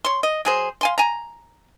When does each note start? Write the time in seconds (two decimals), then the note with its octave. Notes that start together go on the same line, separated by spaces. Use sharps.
0.05 C#5 C6
0.23 D#5
0.45 F#3 G#4 C5
0.81 F5 G#5 C6
0.98 G#5 A#5